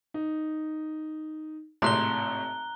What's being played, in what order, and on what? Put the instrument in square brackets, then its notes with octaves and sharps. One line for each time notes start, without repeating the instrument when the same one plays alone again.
[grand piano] D#4
[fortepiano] G#1 A2 C3 [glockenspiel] A#5 F#6 G7 [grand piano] C6